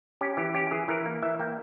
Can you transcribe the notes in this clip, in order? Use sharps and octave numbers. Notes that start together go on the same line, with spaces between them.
C#4 G4
E3 G4
C#4 G4
E3 G#4
E3 A#4
A#3
E3 E5
A#3 G5